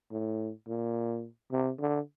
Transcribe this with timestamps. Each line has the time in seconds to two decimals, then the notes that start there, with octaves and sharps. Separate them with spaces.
0.12 A2
0.68 A#2
1.52 C3
1.80 D3